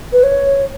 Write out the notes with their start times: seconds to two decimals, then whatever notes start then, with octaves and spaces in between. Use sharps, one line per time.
0.12 B4
0.23 C#5